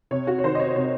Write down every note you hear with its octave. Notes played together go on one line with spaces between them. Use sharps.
C3 C#5
F#4
C#5
D#3 C5
D#5
C#5
C3 C#5